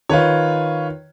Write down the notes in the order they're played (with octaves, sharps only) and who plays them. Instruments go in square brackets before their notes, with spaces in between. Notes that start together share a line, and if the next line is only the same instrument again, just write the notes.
[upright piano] D#3 [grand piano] F4 B4 C#5